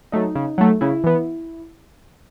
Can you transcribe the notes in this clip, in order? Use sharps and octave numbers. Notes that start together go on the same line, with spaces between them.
F#3 A3 D#4
C#3
F#3 A3
C#3 E4
E3 B3